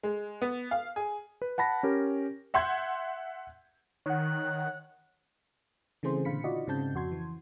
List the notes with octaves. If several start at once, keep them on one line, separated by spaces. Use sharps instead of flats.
G#3
B3
F5
G#4
B4
F#5 A5 B5 A#6
C#4 G4 A#4
E5 F#5 C6 G6 G#6
D#3 C#5 F#5 F#6
C#3 E3 A3 C4 G#4 C5
A#2 D3 F5 B5 B6 C#7
D#4 F4 F#4 D5 D#5
G#2 C#3 C4 A5 G6
F2 F#4 C6 G#6
E3